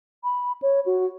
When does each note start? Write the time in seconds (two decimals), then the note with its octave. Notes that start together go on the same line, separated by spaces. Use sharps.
0.24 B5
0.62 C#5
0.86 F#4